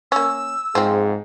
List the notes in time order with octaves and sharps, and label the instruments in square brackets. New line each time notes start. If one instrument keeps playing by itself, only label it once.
[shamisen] A#3 C#4 [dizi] E6
[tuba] G#2 [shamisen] F3 C4 [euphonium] G#4